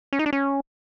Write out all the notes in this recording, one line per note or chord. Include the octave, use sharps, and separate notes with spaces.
C#4
D#4
D4
C#4